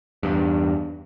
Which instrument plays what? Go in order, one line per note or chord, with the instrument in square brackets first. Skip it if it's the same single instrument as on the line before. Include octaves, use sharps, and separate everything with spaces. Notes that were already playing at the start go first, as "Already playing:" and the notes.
[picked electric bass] E2 G2